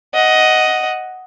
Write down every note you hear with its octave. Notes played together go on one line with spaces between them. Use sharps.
D#5 F#5